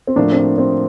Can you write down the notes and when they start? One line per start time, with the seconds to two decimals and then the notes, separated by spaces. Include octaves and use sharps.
0.07 C4
0.16 A2 F3 A#3 D4
0.32 C4
0.37 D4
0.58 C4